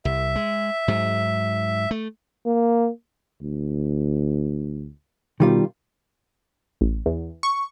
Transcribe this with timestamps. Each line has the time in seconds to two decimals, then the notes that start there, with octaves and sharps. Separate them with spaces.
0.05 C2 E5
0.36 G#3
0.88 G#2 F#3
1.91 A3
2.46 A#3
3.41 D2
5.40 B2 D#3 G3 F4
6.81 A1
7.06 E2
7.43 C#6